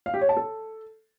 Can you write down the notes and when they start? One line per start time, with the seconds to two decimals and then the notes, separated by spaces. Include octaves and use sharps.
0.06 F5
0.14 G4
0.21 C#5
0.29 A5
0.37 A4